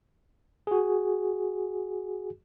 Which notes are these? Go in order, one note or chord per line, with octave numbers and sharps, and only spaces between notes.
F#4 G#4